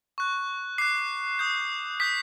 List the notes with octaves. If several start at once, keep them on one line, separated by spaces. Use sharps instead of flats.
C#6 F#6
D6 F#6 C7
D#6 G6
D#6 G6 B6